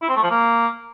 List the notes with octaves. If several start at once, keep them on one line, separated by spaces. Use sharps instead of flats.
E4
C4
A3
F3
A#3